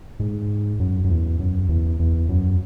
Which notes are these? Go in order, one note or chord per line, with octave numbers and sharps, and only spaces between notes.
G#2
F#2
F#2
E2
F#2
E2
E2
F#2